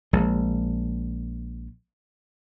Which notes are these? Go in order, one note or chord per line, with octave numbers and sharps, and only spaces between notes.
A#1 G#3